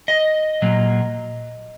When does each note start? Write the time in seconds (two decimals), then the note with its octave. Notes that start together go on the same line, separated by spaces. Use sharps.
0.08 D#5
0.62 A#2 F#3 A#3